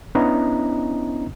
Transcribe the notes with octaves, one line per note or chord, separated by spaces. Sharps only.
B3 C#4 D4 E4 D#5 A#5